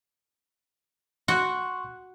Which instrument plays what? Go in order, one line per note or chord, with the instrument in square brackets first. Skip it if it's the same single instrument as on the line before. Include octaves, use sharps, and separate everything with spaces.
[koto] F#4 [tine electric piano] C6 C#6 F#6